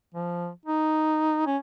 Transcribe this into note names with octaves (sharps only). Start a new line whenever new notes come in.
F3
D#4
C#4